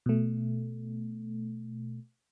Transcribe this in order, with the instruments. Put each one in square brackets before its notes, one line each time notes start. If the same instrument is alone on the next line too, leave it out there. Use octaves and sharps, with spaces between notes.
[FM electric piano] B2 A3